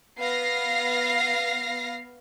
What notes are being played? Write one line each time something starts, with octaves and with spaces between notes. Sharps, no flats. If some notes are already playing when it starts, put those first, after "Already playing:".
B3 F5 A#6 C7